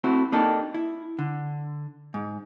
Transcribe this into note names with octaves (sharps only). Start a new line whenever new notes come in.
A3 C4 E4 F#4
A#3 D4 D#4 G4 A4
E4
D3
G#2